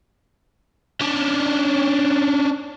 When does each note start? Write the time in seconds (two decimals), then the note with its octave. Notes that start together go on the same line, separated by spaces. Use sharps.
1.01 C#4 D4